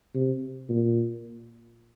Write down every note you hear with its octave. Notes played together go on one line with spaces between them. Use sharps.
C3
A#2